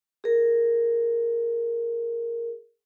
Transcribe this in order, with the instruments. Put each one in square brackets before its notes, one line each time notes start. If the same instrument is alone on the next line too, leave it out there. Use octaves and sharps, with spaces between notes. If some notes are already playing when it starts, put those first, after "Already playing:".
[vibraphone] G#4 A#4